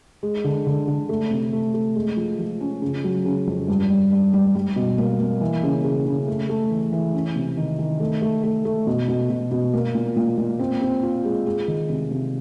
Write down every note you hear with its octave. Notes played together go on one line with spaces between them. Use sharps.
G#3
D3
D3
D3
A3
C3
A3
A3
G#3
F3
F3
C#4
C#3
F#3
C#3
F2
G2
G3
G3
G3
G3
B2
A#3
A#3
E3
C#3
C#3
C#3
A3
A3
E3
E3
C#4
C3
D#3
D#3
A3
A3
A3
A3
B2
B2
B2
B2
A#3
A#2
A#2
A#2
C4
C4
F4
G#3
G#3
D#3
C3
C3